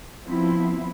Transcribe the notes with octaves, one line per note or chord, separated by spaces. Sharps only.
F3 B3 C4 E4